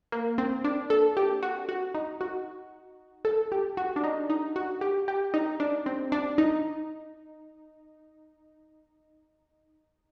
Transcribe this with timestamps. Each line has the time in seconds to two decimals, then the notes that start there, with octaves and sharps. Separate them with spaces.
0.12 A#3
0.38 C4
0.64 D4
0.90 A4
1.17 G4
1.43 F#4
1.69 F#4
1.95 D#4
2.21 F#4
3.25 A4
3.52 G4
3.77 F#4
3.96 D4
4.04 D#4
4.30 D#4
4.56 F#4
4.81 G4
5.08 G4
5.34 D#4
5.60 D4
5.86 C4
6.12 D4
6.38 D#4